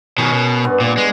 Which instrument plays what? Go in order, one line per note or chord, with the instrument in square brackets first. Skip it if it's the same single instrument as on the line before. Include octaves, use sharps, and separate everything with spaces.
[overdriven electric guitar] B2 D#3 [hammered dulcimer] C#4 G#4 A#4
[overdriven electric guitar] B2
[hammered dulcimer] G2 B3 D5
[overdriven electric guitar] A#2
G#3